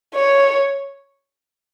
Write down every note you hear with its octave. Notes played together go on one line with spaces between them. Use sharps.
C#5